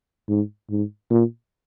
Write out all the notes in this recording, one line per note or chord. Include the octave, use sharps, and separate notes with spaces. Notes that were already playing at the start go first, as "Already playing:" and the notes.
G#2
G#2
A#2